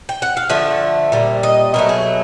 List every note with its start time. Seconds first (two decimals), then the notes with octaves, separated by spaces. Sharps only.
0.09 G5
0.22 F#5
0.37 F5
0.49 D3 F3 A3 E5
1.12 A#2 G3
1.43 D#5
1.74 B2 F#3 A3 A#4
1.89 G#4